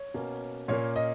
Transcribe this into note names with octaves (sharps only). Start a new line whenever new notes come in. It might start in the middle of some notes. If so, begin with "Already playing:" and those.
Already playing: C#5
B2 A#3 C#4
A#2 A#3 C#4 C#5
D#5